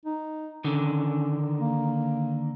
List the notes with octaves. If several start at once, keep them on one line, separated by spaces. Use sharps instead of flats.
D#4
D3 D#3 C#4
A#3